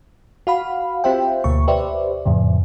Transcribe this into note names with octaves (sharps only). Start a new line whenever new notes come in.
F#4 F5 B5
C4 F4 G4 C5 E5 G5
D2 B2 A#3 C#6
G4 B4 C5 D5 E5
F2 A2 C#3